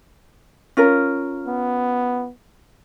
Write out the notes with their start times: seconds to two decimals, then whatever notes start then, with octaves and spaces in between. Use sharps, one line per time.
0.77 C#4 F4 A#4
1.47 B3